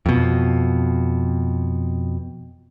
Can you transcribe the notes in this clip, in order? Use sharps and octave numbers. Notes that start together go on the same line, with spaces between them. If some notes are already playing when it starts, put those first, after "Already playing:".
F2 B2